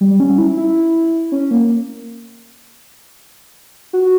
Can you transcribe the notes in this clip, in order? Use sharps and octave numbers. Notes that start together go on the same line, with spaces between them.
G3
C#4
E4
E4
C#4
A#3
F#4